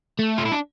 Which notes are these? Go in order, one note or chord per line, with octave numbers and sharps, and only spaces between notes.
A3
F4
E4
D4